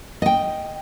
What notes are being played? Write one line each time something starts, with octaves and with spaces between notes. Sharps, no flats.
D#5 G5